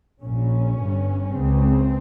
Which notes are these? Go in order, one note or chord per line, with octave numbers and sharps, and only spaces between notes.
A#1 A#2 C#4
G1 G2
C#2 C#3 C4